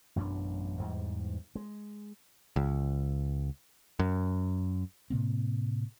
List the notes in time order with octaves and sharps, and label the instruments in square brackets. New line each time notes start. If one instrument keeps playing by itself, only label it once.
[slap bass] A1 F#2 B2 D4
E2 G#2 G3
G#3
[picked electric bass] C#2
F#2
[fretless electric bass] A2 C3 A#3 C4